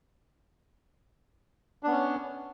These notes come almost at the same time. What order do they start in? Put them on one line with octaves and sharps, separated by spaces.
D4 B3 C#4